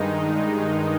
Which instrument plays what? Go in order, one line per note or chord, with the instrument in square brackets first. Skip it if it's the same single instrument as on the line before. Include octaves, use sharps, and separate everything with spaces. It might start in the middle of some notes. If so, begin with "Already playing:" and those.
Already playing: [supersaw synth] G2 D#3 G#3 D#4